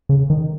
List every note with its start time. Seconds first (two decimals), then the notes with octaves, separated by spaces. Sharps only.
0.09 C#3
0.30 D#3